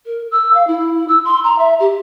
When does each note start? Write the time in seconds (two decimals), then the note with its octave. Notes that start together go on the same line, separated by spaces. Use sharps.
0.06 A#4
0.31 E6
0.54 F5
0.67 E4
1.08 E6
1.25 C6
1.44 A#5
1.59 E5
1.80 G4